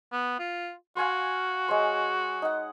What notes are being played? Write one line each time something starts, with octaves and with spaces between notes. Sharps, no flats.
B3
F4
F#4 F5 G#5 C6
G#3 C#5 C6
D#4 F#5